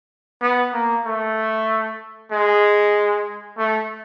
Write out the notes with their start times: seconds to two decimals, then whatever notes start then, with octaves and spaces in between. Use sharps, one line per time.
0.42 B3
0.73 A#3
1.05 A3
2.31 G#3
3.58 A3